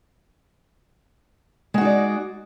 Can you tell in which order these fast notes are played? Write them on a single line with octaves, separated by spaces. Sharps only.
G#3 F#4 D#4 D5